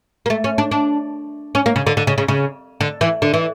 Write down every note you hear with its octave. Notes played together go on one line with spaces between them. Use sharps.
A#3
A3
C#4
D4
D4
C#4
A#3
C#3
D3
D3
C#3
C#3
C#3
D3
E3
D3
E3